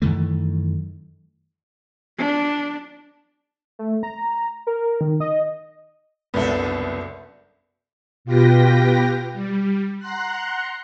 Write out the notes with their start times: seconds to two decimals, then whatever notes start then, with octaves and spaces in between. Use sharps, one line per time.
0.02 F#2 D#3 E3 A3
2.18 D4
3.79 A3
4.03 A#5
4.67 A#4
5.01 D#3
5.20 D#5
6.34 F#1 C2 C#3 B3 D4 A4
8.25 B2 F4 G4 B4 G5 A#6
9.33 G3
9.98 F#5 A#5 C6 F#6